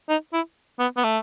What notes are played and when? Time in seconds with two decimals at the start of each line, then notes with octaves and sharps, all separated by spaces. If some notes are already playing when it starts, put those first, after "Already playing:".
0.09 D#4
0.33 E4
0.79 B3
0.97 B3
1.04 A3